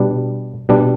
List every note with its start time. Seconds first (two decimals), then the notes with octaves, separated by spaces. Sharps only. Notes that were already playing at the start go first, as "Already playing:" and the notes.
Already playing: B2 G3 D4
0.69 B2 G3 D4